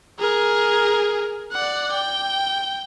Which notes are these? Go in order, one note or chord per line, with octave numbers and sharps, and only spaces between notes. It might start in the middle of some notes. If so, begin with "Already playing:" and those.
G#4 A#4
D5 F#5
G5